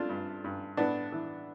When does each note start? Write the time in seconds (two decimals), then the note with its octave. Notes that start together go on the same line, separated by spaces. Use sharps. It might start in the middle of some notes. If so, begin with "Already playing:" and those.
Already playing: A3 C4 D4 F4
0.09 G2
0.44 G2
0.77 A2 B3 D4
1.12 E3